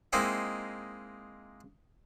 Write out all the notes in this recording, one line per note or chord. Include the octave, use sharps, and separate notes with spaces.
G#3 A#3 C4 D#4 E4